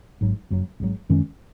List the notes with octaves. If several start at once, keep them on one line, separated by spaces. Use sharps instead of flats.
G#1 G#2 F#3
F#1 F#2 F#3
G#1 G#2 F#3
F#2 D#3 G#3 C#4